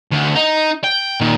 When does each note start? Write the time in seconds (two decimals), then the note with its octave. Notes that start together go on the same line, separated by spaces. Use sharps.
0.12 D2
0.35 D#4
0.84 G5
1.21 A#2 D#3